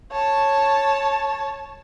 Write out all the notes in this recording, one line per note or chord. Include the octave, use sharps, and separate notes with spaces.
C#5 A5